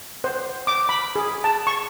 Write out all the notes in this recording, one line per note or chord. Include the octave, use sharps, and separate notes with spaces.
C5
D6
B5
G#4
A5
C#6